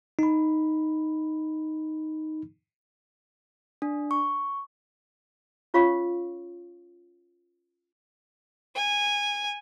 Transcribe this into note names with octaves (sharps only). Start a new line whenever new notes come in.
D#4 B5
D4
C#6
C#4 F4 C#5 F5 C#6
G#5